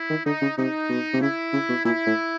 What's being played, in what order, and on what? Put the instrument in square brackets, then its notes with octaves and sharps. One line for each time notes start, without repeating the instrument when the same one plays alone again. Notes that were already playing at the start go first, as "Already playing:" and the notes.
Already playing: [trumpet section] E4
[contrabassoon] D#3
[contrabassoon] D3 [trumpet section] D#4
[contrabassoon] C#3
[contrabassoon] C3 [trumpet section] D#4
[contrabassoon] B2
C3
[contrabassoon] C#3 [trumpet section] E4
[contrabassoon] C#3
B2
[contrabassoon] A#2 [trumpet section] E4
[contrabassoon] A2